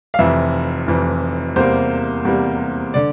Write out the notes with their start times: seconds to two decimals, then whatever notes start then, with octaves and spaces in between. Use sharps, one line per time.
0.14 F5
0.19 F1 F2 E3 E5
0.87 F1 F2 E3
1.56 E2 C3 G3 A#3 C5
2.25 E2 C3 G3 A#3
2.94 D3 D5